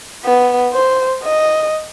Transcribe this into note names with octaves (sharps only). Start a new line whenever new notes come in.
B3
C5
D#5